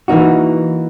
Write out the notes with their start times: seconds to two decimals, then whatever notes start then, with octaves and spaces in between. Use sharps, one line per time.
0.08 E3 A#3 D#4 F#4